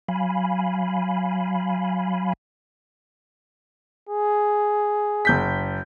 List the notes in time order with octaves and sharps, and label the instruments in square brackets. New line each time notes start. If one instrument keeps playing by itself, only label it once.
[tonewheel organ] F#3 F5 G#5 B5
[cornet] G#4
[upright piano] F#1 G6 B6